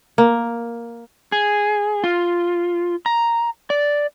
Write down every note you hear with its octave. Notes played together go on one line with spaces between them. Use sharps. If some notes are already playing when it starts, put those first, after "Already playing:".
A#3
G#4
F4
A#5
D5